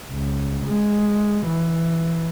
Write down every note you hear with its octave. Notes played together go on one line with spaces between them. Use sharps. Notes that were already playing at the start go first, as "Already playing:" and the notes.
C#2
G#3
E3